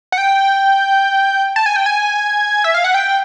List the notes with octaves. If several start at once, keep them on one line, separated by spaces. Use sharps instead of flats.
F#5
G5
A5
G#5
G5
G#5
E5
F5
F#5
G5